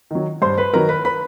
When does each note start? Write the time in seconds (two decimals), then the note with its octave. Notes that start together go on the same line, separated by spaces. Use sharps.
0.11 D#3 F#3
0.42 G2 C5 C6
0.58 B4 B5
0.73 D#3 F#3 A#4 A#5
0.89 B4 B5
1.05 B4 B5